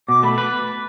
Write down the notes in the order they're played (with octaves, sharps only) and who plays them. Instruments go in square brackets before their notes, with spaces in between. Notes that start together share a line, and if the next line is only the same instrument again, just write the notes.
[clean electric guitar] B2 [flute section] D6
[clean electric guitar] A3 [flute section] B5
[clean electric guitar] B4 [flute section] D6